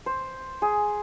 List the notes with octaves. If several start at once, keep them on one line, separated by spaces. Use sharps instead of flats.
C5
G#4